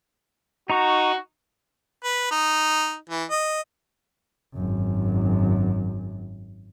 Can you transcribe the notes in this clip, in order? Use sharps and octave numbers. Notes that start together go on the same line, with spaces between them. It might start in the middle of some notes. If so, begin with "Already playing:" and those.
D#4 F#4 A#5 C#6
B4
D#4
E3
D#5
G#1 F#2